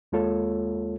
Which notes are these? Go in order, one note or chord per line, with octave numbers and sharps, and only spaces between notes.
D#2 G#3 A#3 F4 A4 C#5